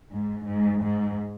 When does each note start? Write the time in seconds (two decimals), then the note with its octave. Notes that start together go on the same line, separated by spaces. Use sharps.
0.12 G#2
0.46 G#2
0.80 G#2